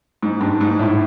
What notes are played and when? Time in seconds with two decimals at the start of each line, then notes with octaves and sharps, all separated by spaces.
0.22 G#2
0.41 G2
0.61 G#2
0.79 A2